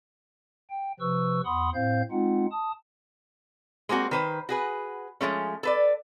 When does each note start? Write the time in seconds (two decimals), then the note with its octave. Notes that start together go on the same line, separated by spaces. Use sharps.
0.70 G5
1.00 C3 F3 B4 C#6 E6
1.45 E2 F#5 B5 C6 D#6
1.74 A2 C4 C5 F5 G6
2.11 G#3 C4 D#4 F4 F#5
2.51 A5 D#6
3.89 G#3 A#3 C4 F#4
4.11 D#3 B4 C5
4.49 F#4 G#4 B4
5.21 F3 G#3 A3 C#4
5.63 A4 B4 D5